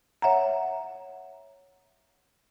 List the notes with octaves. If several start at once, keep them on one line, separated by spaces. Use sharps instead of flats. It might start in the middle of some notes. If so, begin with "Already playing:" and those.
C#5 E5 F#5 A#5